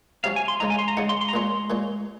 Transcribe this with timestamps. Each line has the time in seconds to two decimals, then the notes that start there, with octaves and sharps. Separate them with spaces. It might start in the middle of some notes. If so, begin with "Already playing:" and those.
0.24 C3 F#3 C#4 F5
0.36 G#5
0.48 C6
0.60 C#3 G#3 D#4 A#5
0.70 G#5
0.79 C6
0.88 A#5
0.97 C#3 G#3 D#4 F#5
1.09 C6
1.21 C6
1.29 A#5
1.33 A#2 G#3 C#4 C6
1.70 A#2 G#3 C#4